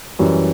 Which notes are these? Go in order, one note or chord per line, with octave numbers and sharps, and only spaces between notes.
F#2 E3 G3 C#4